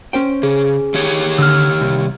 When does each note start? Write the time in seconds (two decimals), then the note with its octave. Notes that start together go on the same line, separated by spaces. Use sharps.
0.13 C#4 C5 G5
0.43 C#3 G#4
0.94 D#3 G4 C#5
1.38 D3 E6 F6
1.81 C2